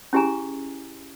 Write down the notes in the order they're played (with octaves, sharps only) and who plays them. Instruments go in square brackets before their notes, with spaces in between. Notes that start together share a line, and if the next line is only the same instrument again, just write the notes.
[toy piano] C#4 E4 G4 G#4 G#5 A#5